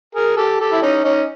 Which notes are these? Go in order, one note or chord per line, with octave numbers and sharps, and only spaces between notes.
G#4 A#4
G4 A4
G4 A4
E4
C#4 D#4
C#4 D#4